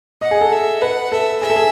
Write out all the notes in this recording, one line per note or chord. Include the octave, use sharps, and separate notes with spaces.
D#5 F#5
G#4
A4
E5
B4 F#5
A4 E5
G#4 E5
A4
G#4